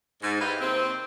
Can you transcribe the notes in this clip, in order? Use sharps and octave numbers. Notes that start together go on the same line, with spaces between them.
G#2
E4 G4 B4 C5 D#5 F5
D#2 C3 C4